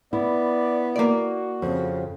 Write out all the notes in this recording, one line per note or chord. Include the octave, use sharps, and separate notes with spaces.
B3 E4 D5
A#3 F#4 D5
F2 C#3